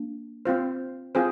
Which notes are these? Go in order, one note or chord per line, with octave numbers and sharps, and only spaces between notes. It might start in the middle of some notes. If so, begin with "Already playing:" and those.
Already playing: A#3 D4
C4 F4 C5
C4 F4 G#4 C5